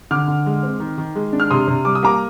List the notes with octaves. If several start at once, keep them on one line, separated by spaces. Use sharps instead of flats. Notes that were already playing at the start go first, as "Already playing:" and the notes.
D3 D6 F6
D3
G#3
C4
D#3
D#3
G#3
D4
F6
C3 C6 D#6
C3
G3 D6
D#6
A#3 A#5 D6